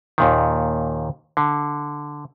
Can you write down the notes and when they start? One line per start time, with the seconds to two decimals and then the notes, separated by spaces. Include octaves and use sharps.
0.18 D#2 A#2 D#3
1.37 D3